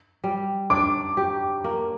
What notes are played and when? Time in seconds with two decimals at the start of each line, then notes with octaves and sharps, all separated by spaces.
0.24 G3
0.70 D4 D6
1.17 G4
1.64 A#3